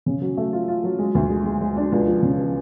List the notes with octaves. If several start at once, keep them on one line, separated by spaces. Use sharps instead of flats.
C#3
F#3
A3
F4
F4
F#3
G#3
D2
G#3
G#3
G#3
D4
C#2
F3
C#3
F3